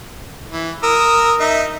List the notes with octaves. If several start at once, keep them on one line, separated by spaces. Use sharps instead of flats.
E3
A#4 D#6 E6
D#4 E5